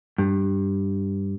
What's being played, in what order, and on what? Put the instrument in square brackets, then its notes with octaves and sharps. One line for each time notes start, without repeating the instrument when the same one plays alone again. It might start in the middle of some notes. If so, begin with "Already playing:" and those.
[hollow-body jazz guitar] G2